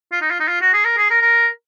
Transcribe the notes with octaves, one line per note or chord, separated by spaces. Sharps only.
F4
D#4
F4
D#4
F4
F#4
G#4
A#4
G#4
A#4
A#4